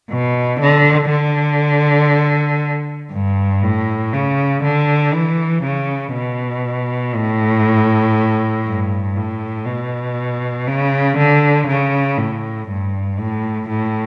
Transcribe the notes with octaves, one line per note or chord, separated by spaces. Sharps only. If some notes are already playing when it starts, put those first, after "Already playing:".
B2
D3
D3
G2
A2
C#3
D3
E3
C#3
B2
A2
G2
A2
B2
C#3
D3
C#3
A2
G2
A2
A2